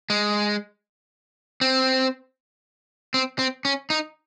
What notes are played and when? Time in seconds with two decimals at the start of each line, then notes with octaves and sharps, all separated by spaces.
0.10 G#3
1.61 C4
3.14 C4
3.39 C4
3.65 C#4
3.90 D#4